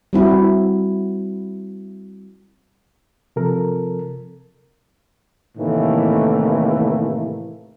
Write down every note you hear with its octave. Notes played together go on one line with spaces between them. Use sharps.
G3 C4 E4 F#4
C3 F3 A4 A#4
A2 C3 D#3 E3 A3 A#3